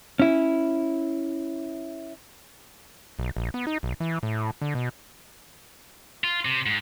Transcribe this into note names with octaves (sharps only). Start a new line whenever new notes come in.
C#4 E4
B1
A#1
B3
D#4
B1
E3
A2
D3
B2
F4
C3
G#2